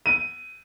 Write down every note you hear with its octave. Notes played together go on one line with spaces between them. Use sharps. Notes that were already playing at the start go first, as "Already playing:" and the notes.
D#7